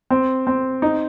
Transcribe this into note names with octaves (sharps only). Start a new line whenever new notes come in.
C4
C4
D#4